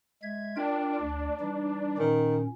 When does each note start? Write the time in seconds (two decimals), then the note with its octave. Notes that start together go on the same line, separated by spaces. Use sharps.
0.23 G#3 E5 G#6
0.57 D4 F4 A#4 G5
1.01 D2
1.40 E3 G3 D#4
1.99 A#2 D#3 C#4